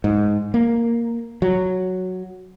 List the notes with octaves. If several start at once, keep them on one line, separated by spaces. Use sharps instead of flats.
G#2
A#3
F#3